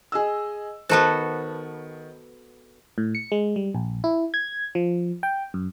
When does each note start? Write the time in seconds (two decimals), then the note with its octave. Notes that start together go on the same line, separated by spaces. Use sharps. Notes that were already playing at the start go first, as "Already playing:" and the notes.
0.12 G#4 D#5 E6
0.89 D#3 B3 F#4 A4 C5 A5
2.98 A2
3.15 C#7
3.32 G#3
3.56 G3
3.75 A#1
4.04 E4
4.34 G#6
4.75 F3
5.23 G5
5.54 F#2